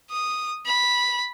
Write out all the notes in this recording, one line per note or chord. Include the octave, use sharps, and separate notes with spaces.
D#6
B5